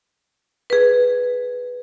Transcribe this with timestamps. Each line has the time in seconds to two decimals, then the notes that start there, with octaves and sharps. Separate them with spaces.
0.70 G#4 B4